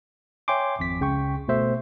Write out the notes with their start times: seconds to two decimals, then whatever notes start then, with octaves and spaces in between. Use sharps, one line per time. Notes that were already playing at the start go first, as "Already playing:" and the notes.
0.48 C#5 E5 G5 G#5 C6 D6
0.79 G#1 F2 B6
1.00 C#2 C#3 G5 C#6
1.48 G1 B2 A3 C5 E5